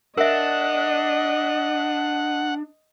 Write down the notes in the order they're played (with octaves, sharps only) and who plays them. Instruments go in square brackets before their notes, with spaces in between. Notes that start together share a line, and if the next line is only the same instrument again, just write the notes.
[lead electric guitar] D4 [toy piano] A#4 E5 [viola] D#5 [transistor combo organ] F#5